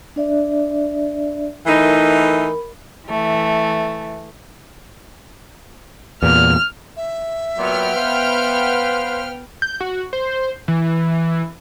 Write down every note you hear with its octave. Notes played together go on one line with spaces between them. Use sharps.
D4 D5 E5
E3 A3 D#4 A#4 B5
E3 A3
E2 A#2 F6
E5
A#2 F#3 B3 G5 F6
B4 C5 F5
G6
F#4
C5
E3